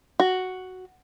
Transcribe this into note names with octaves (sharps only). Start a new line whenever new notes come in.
F#4